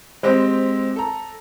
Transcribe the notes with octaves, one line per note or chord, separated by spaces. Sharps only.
G#3 C4 G4 C5
A4 A#5